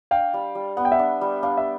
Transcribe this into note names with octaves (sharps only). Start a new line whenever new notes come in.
D4 F5 G5
G3
G3
B3 F#5
G5
E5 F#5
D4
G3
D4 F5
E5